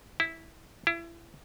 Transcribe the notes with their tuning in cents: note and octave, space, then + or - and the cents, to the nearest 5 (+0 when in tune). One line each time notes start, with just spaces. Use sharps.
E4 -10
E4 +30